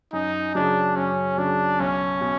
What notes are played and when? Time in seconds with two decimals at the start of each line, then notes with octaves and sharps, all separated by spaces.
0.13 F#2 D#4
0.55 C#3 F#3 D4
0.96 F#2 C#4
1.38 C#3 F#3 D4
1.80 B1 C#4
2.21 B2